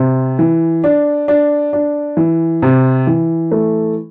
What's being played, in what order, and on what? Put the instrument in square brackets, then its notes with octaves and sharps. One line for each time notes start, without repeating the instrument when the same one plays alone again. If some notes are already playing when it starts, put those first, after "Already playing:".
Already playing: [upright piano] C3
E3
D4
D4
D4
E3
C3
E3
A3